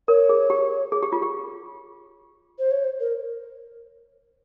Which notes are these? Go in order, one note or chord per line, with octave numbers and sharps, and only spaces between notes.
A#4 C#5
G#4
G4
G#4
G4
F4
G4
C5
C#5
C5
A#4